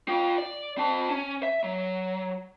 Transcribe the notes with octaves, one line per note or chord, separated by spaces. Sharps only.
F4 G5
D5
C4 A5
C#4
E5
F#3